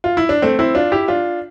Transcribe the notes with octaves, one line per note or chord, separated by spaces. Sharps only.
F4
E4
D4
A3 C4
C4 E4
D4 F4
E4 G4
D4 F4